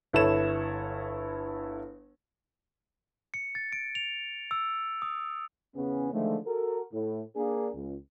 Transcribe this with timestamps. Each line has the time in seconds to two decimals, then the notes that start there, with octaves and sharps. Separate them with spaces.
0.13 G1 E4 A4 C#5 E7
3.34 C#7
3.55 A6
3.73 D7
3.95 F7
4.51 E6
5.02 D#6
5.76 E2 C#3 B3 C#4
6.13 D3 D#3 F3 G#3 A3
6.47 F#4 A4 A#4
6.93 A2
7.36 A#3 D4 G#4
7.74 C#2